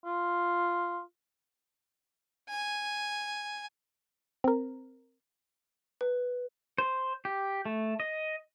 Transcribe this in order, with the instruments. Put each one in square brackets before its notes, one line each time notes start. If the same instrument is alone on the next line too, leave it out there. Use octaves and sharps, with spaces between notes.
[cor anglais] F4
[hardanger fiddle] G#5
[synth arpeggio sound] C4 A#4
[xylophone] B4
[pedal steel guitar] C5
G4
A3
D#5